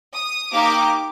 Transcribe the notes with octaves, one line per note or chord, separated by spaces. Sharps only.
D#6
A#3 D#4 G4 D6